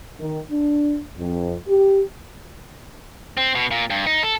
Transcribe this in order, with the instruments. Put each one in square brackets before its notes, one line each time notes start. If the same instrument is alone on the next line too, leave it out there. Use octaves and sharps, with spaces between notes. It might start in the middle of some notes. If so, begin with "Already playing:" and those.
[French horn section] D#3
D4
F2
G4
[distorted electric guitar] C4
B2
A#2
G2
D#4
A4